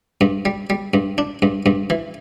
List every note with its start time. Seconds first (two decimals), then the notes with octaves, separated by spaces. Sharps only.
0.21 G2
0.45 G3
0.70 G3
0.94 G2
1.18 D4
1.42 G2
1.66 G2
1.90 E3